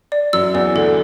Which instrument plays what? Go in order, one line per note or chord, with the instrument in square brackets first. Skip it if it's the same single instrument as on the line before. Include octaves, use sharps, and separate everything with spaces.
[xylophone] D5
[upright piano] F#2 F#3 [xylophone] E6
[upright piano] E2 E3 [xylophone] D5
[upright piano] D2 D3 [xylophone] A4